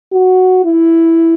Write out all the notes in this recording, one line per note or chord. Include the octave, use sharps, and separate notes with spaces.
F#4
E4